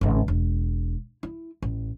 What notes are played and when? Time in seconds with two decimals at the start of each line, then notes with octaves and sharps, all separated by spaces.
0.01 G#1 C#3
0.28 E1
1.23 E4
1.62 A1